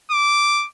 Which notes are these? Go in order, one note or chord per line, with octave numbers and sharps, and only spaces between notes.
D6